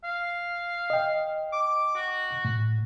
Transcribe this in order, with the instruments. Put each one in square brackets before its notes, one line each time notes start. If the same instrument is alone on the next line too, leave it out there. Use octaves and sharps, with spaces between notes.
[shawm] F5
[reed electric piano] D#5 G5
[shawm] D6
F#4
[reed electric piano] A2